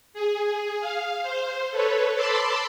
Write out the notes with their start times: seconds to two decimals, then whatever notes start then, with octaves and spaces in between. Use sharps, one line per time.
0.14 G#4
0.81 F5
1.23 C5
1.71 A4 B4 C#5
2.15 A5 B5 C6 D6 E6